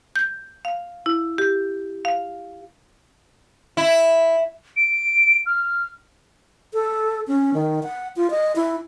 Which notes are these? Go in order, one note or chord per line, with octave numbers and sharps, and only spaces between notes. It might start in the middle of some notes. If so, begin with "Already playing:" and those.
G6
F5
E4
G4
F5
E4
D7
F6
A4
C#4
D#3
F#5
F4
D#5
E4